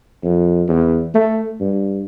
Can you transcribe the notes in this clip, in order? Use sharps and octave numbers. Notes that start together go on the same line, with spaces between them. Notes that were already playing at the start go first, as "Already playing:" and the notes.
F2
E2
A3
G2